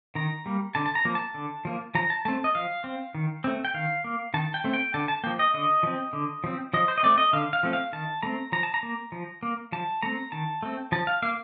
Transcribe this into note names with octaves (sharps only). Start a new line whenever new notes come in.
D#3 A#5
G3 A#3
D3 A5
A5
A#5
F3 A#3
A5
D3
F3 A#3
F3 A#5
A5
A3 C4 A5
D#5
F3 F5
C4
D#3
A3 C4
G5
D#3 F5
A#3
D#3 A5
G5
A3 C4
G5
D3 A5
A5
F3 A#3 G5
D#5
D3 D#5
F3 C4
D3
F3 C4
F3 D#5
C5
D#5
A3 C4 D5
D#5
D3 F5
F5
F3 A3 C4
F5
D#3 A5
A3 C4 A#5
F3 A#5
A5
A#5
A#3
F3
A#3
F3 A5
A3 C4 A#5
D#3 A5
A3 C4
F3 A5
F5
A#3 F5